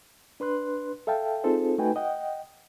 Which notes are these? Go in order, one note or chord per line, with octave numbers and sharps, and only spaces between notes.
D4 B4 C6 F#6
A4 E5 F5 G5 A5
C4 D#4 F4 G#4 A4 C5
A3 D#4 F#4 B4 G5 G#5
D#5 F#5 G5